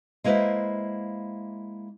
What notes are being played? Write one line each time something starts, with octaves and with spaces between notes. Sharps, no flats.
G#3 A#3 E4 B4 C5 E5